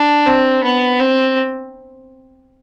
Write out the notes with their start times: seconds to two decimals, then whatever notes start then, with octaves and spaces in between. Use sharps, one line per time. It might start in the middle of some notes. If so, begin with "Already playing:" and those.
Already playing: D4
0.26 C4
0.64 B3
1.00 C4